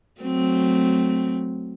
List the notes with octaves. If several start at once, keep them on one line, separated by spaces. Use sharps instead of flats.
F#3 A3 C4